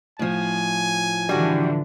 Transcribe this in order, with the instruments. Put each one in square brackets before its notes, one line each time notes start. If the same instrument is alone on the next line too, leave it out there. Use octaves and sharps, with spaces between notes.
[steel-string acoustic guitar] A2 F3 [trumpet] G#5
[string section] D3 E3 [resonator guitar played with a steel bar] G3 F#4